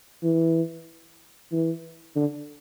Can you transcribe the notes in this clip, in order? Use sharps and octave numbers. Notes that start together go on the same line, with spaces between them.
E3
E3
D3